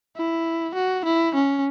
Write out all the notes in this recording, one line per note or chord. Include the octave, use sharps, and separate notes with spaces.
E4
F#4
E4
C#4